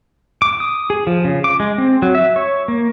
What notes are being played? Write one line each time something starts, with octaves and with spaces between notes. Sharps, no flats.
D6
D#6
G#4
F3
C#3
D6
G#3
C4
F#3
E5
C#5
A#3